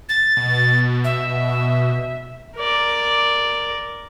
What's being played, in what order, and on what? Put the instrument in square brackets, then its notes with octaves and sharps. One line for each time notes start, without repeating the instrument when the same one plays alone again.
[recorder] A6
[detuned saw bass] B2
[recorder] E5
[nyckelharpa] A#4 D5